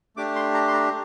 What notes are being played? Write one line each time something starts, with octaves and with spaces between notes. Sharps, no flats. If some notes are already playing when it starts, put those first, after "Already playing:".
A3 D4 G4 D6
C6
A#5
C6
A#5